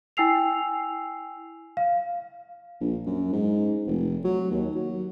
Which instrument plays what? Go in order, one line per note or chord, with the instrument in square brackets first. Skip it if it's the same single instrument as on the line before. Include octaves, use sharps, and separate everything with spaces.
[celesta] E4 G5 G#5 E6 C7 F7
F5
[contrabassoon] A#1
F#2
G#2
F1
F#3
D#2
F#3